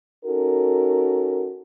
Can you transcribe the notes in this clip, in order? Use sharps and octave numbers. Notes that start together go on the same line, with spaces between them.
C#4 D#4 F#4 A4 A#4